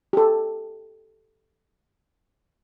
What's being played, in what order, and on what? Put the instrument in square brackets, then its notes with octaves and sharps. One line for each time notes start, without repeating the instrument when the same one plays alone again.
[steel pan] G4 A4